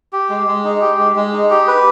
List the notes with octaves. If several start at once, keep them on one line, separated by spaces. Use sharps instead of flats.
G4
G#3
G#3
D#4
G4
G#3
G#3
D#4
G4
B4